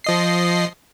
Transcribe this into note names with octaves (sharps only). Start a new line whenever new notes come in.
F3 D#5 C7